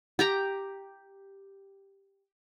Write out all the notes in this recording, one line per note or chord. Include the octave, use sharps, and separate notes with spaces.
G4 G5 A#5